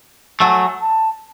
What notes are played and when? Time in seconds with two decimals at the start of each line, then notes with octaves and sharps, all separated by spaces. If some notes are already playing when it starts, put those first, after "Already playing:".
0.40 F#3 A3 G#5
0.81 A5